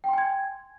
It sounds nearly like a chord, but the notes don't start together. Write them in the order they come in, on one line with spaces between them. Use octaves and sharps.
G5 C6 G#5 G#6